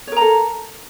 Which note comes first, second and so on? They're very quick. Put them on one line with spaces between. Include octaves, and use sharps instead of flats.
C#5 A#4 A#5 A4